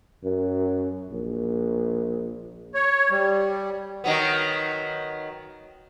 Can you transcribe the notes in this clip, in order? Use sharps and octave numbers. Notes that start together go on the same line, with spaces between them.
F#2
A#1
C#5
G3
D#3 F#3 B3